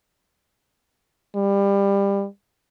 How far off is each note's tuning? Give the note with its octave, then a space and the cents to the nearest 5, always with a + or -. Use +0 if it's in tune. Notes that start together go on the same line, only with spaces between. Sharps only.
G3 +25